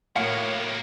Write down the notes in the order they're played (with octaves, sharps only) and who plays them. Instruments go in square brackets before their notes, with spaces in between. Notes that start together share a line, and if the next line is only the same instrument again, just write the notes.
[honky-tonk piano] A2 F5 C#7 [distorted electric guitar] A#3 F#4 [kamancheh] A#4 C#5